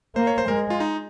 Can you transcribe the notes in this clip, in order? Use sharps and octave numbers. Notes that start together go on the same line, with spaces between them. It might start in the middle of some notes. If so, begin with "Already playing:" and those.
A#3 C5
C#5
C5
G#3 A#4
F4
D#4